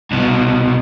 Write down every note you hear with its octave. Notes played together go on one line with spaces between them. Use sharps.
C2 B2